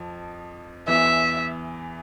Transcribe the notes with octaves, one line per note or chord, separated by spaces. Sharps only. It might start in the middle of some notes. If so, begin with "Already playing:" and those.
Already playing: F2 F3
E2 E3 E5